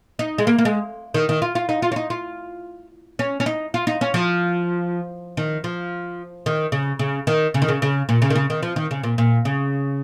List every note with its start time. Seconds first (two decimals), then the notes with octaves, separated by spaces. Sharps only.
0.19 D#4
0.38 G#3
0.47 A#3
0.59 A#3
0.65 G#3
1.14 D#3
1.29 D#3
1.42 F4
1.55 F4
1.69 D#4
1.82 F4
1.92 C#4
1.96 D#4
2.10 F4
3.19 C#4
3.40 C#4
3.46 D#4
3.74 F4
3.87 D#4
4.01 C#4
4.14 F3
5.37 D#3
5.64 F3
6.46 D#3
6.72 C#3
6.99 C#3
7.27 D#3
7.54 C#3
7.62 D#3
7.68 C#3
7.82 C#3
8.09 A#2
8.22 C#3
8.30 D#3
8.35 C#3
8.50 D#3
8.63 F3
8.76 D#3
8.91 C#3
9.04 A#2
9.18 A#2
9.45 C#3